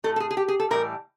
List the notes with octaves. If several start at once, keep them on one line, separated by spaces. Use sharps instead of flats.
A2 E3 A3 A4
A4
G#4
G#4
G4
G#4
A4
A2 E3 G3 A#4